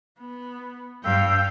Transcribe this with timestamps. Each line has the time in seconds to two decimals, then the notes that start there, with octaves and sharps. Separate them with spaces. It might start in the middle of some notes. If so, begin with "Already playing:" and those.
0.19 B3
1.05 G2 F5 G5 E6